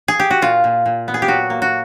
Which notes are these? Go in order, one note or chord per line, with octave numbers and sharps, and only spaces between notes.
G#4
G4
F#4
A#2 F4
A#2
A#2
B3
G#4
G4
F#3 F#4
A#3
F#4